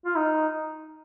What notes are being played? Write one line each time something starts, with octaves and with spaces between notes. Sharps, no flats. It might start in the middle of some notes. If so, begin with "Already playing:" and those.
F4
D#4